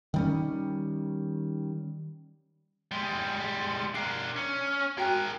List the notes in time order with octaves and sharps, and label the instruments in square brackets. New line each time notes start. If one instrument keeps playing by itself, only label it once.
[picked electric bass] D#3 G3 C#4
[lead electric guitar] G3 G#3
[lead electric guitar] D4 A#4 [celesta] C7
[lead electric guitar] C#4
[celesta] F6
[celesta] F#4 G5 F#6 [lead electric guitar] G#4 A#4